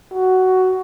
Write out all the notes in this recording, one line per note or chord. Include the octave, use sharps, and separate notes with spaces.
F#4